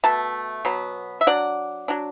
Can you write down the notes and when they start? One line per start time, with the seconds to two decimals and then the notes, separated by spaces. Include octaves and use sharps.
0.04 B2 A3 A5
0.65 B2 F#3 B3
1.21 E5
1.27 F#3 D4 D5 F#5
1.88 F#3 D4